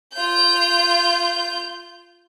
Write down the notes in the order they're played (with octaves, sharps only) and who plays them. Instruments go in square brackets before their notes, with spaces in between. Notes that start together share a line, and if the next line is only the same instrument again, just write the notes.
[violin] F4 G6